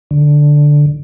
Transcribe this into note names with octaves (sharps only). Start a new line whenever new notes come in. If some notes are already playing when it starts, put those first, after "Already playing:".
D3